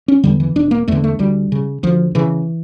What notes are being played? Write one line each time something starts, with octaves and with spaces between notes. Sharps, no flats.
C#4
E2 D3 G3
E3
E1 D4
A#3
E2 D3 A3
A3
D2 G3
C#3
D2 F3
C#3 E3